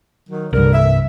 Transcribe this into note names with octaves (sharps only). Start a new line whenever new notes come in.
D#3 F#3
C2 G2 D3 A#4
E5